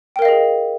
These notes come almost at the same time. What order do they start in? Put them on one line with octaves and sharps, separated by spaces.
G5 A#4 F5 D#5 G#4